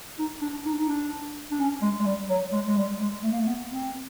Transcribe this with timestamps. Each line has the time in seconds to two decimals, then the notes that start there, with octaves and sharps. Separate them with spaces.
0.19 D#4
0.41 D4
0.65 D#4
0.73 D4
0.79 D#4
0.89 D4
1.51 D4
1.60 C#4
1.82 G#3
2.00 G#3
2.06 G3
2.29 F#3
2.52 G#3
2.67 G#3
2.77 G3
3.01 G#3
3.23 A3
3.32 A#3
3.39 A3
3.47 B3
3.70 C4